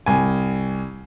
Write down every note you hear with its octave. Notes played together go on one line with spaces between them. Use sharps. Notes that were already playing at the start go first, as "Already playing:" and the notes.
C2 G#5